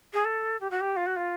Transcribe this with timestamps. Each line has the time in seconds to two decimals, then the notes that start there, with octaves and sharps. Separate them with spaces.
0.13 G#4
0.24 A4
0.60 G4
0.70 F#4
0.80 G4
0.96 F4
1.06 F#4
1.16 F4